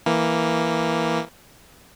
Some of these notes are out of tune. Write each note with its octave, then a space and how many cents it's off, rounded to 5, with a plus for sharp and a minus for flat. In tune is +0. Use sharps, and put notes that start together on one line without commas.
E3 +0 A#3 +0